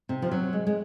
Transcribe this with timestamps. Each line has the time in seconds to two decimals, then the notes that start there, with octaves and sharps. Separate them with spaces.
0.09 C3
0.22 F3
0.31 F#3
0.53 G#3
0.67 G#3